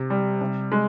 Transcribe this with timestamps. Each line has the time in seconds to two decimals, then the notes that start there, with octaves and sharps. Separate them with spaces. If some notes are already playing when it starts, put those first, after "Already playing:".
Already playing: C3
0.10 G3
0.41 C3
0.72 G#3